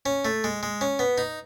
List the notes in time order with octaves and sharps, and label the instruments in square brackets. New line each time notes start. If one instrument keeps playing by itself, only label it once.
[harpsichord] C#4
A3
G#3
G#3
C#4
B3
D#4